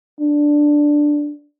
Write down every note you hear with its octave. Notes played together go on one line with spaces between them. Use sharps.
D4